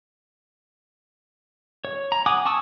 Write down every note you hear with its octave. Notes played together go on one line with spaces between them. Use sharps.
C#5
A#5
F#5 G#5 D6 D#6
G#5 A5 C#6 D#6 E6